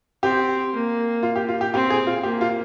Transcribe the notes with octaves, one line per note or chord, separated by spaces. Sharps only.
C4 G4
A#3
F4
G4
F4
G4
C4 G4
G#4
F4
A#3 G4
F4